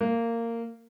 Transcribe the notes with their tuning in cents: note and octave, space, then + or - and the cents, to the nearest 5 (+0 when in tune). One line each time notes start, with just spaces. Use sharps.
A#3 -15